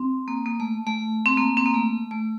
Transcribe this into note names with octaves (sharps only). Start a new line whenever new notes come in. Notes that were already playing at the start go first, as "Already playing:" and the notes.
Already playing: C4
A#3
A#3
A3
A3
C4
A#3
C4
A#3
A3
A3